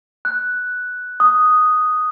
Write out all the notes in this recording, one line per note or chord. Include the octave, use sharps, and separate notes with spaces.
F#6
D#6